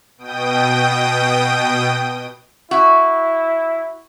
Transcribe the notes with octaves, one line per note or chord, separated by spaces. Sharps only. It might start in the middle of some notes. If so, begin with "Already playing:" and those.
B2 G5 D#6
E4 F#4